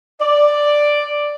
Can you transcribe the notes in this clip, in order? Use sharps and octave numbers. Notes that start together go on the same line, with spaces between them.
D5